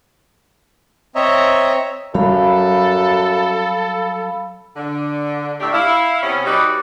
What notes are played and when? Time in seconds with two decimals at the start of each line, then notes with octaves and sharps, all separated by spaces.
1.15 C4 C#5 D#5 E5 A#5
2.14 F#2 F#3 G3 C#4 A4 F5 B5
4.76 D3
5.60 A2 A3 D4 G4 E5
5.73 E4 F5
6.23 C3 B3 C#4
6.46 G3 D#4 F#4 B4 D5